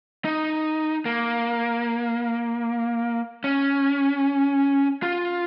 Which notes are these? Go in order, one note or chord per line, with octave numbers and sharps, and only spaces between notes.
D#4
A#3
C#4
F4